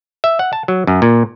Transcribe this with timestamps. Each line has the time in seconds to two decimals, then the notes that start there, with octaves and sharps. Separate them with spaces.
0.24 E5
0.39 F#5
0.53 A5
0.68 F#3
0.87 F#2
1.02 A#2